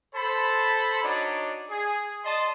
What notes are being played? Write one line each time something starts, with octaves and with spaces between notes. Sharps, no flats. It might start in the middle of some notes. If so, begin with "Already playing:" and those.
A4 C5 A5 B5
D4 D#4 F#4 C#5 D5
G#4
D5 D#5 A5 C6